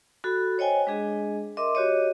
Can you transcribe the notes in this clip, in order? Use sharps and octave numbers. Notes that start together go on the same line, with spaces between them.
F#4 A4 B5
C5 C#5 D#5 G5 G#5
G#3 D4 G#4 D#5
A#4 D#5 E5 C6 D6
F#4 G4 C#5 D#5